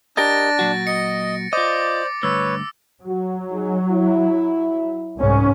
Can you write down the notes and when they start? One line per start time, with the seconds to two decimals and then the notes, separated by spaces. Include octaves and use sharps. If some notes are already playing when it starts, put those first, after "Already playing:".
0.17 D4 G4 A#4 D#5 A6 A#6 D7
0.59 A#2 F#3 F#4
0.87 D#5 C#7
1.53 F4 C5 D5 D#5 D6
2.23 D2 G2 B4 C#5 E6
3.06 F#3 F#4
3.50 D#4 G#4
3.89 E4
5.20 C2 G#2 C#4